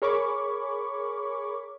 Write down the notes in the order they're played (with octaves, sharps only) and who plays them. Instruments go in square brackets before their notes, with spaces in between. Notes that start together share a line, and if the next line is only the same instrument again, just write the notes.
[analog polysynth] G#4 A#4 C#5 B5 C#6 D6